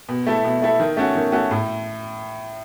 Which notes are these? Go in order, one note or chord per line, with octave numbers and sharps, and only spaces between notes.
B2
A3 E4 A4
B2
A3 E4 A4
D#3
A3 C#4 F#4
D#3
A3 C#4 F#4
A2